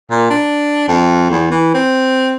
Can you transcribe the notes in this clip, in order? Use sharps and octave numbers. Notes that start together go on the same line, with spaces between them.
A#2
D4
F2
E2
E3
C4